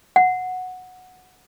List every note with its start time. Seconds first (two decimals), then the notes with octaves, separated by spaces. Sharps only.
0.16 F#5